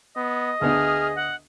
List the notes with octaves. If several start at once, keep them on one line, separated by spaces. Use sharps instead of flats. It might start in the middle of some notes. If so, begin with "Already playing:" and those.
B3 D#5
D2 B3 D4 G#4 F6
F#5